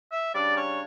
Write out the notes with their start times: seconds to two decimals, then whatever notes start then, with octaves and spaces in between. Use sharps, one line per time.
0.11 E5
0.34 C#3 G3 D4 D5
0.56 C#5